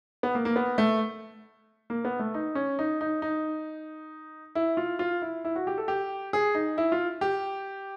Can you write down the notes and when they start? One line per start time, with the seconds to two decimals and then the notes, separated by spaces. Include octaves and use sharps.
0.23 B3
0.35 A#3
0.45 A#3
0.56 B3
0.78 A3
1.90 A#3
2.05 B3
2.19 A3
2.34 D#4
2.55 C#4
2.79 D#4
3.01 D#4
3.22 D#4
4.55 E4
4.77 F4
4.99 F4
5.22 E4
5.45 E4
5.56 F#4
5.67 G4
5.78 A4
5.88 G4
6.33 G#4
6.55 D#4
6.78 E4
6.92 F4
7.21 G4